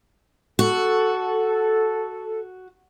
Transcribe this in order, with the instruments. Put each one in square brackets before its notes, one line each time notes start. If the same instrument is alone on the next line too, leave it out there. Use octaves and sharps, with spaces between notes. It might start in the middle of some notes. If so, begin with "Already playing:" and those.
[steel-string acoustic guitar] F#4 [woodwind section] A4